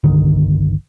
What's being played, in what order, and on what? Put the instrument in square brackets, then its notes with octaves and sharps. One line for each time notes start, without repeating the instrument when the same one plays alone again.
[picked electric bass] G1 C2 D3 D#3